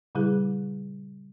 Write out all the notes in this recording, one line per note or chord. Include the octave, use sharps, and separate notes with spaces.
A#2 C#3 G3 E4 G#4